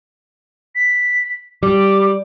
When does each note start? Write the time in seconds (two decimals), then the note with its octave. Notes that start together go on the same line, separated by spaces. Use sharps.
0.75 B6
1.63 G3 D6